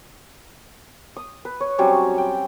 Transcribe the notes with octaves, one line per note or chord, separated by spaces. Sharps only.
D#6
B4
C#5
F#3 G3 C4 C#4
G5